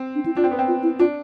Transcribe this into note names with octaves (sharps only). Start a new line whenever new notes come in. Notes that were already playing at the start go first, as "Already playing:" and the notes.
Already playing: C4
D4
E4
D4 F4
C4
B3
C4
F4
E4
D4 F4